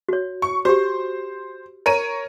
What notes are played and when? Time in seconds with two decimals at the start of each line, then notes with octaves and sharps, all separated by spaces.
0.09 F#4 C#5
0.42 C#6
0.65 F#4 G4 C5
1.86 A#4 C#5 D#7